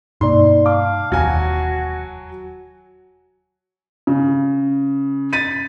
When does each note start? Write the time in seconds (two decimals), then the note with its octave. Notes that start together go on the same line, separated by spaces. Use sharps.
0.21 G2 B2 A#3 D#4 D5 C6
0.66 F5 A5 D6
1.12 E1 D#2 F#3 F#4 G#5
4.07 C#3
5.33 A6 B6 D#7